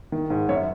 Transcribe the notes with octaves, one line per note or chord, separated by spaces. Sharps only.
D#3
G#2
F#2 C#5 E5